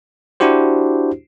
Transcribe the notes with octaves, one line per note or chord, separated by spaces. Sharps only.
D4 E4 F#4 G4 C5